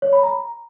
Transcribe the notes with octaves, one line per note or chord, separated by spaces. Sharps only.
C#5
B5
A#5